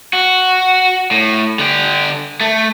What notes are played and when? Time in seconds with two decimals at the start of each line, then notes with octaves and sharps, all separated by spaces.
0.13 F#4
1.11 A2
1.59 D3 G4
2.41 A3